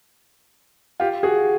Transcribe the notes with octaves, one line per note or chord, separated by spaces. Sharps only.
F4 G4
F#4 G#4